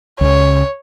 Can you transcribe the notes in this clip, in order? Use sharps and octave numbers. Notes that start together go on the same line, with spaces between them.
C#2 C#3 C#5